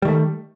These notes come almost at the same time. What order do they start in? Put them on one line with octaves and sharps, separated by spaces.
G3 D#3 A3